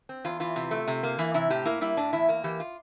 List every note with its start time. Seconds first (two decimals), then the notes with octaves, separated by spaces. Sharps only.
0.09 C4
0.25 E2 F4
0.40 E3 F4
0.56 C3
0.71 A3
0.88 C3
1.03 A#3
1.18 E3 E4
1.34 C3 E4
1.50 A2 G4
1.65 A#3 E4
1.81 G3 E4
1.97 A2 D4
2.13 E2 E4
2.29 A#3
2.44 E3 G4
2.60 F4